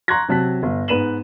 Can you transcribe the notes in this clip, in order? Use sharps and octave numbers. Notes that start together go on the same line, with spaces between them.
A#5 C6 C#6 F#6 G#6 A#6
C3 F#3 A5 F#6 B6
G1
G#2 B3 B4 D#7 E7 F#7